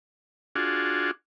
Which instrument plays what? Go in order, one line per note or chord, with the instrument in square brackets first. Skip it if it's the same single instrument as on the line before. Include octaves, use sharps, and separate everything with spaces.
[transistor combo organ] D4 F4 F#4 G#4